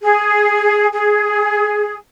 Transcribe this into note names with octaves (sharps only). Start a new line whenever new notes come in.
G#4
G#4